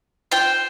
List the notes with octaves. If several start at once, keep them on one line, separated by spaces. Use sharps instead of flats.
F4 C5 G5